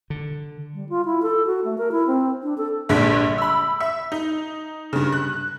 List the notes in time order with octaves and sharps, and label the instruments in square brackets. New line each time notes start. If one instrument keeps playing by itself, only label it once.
[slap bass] D3
[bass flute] G3
F4
E4
A4
F#4
A3
A#4
E4
C4
D4
A4
[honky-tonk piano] A#1 G2 D3 G#3 D4 B6
B5 E6
E5
D#4
G2 C#3
F#6